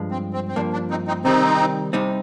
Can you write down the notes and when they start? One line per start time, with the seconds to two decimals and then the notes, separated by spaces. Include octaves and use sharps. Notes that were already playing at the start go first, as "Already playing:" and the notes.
Already playing: G2 F3 G#3
0.11 C4
0.33 C4
0.48 C4
0.56 G2 F3 A#3 D4
0.73 D4
0.90 C4 D#4
1.08 C4 D#4
1.24 C3 D#3 G3 C4 D#4
1.93 C2 C3 G3 C4 D#4